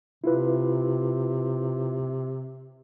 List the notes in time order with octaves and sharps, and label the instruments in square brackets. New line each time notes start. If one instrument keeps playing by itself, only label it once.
[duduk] C3 [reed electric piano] E4 F4 B4